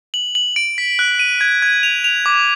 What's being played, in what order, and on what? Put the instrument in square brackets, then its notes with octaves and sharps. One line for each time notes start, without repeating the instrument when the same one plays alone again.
[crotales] F#7
F#7
D7
B6
F#6
D#7
G#6
G#6
F7
F7
D6